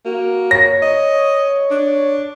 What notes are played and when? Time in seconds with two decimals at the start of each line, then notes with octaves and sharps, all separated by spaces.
0.05 A#3 F#4
0.51 C#5 A#6
0.82 D#5
1.71 D4